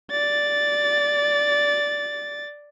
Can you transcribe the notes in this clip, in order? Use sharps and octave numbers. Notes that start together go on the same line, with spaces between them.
D5 A6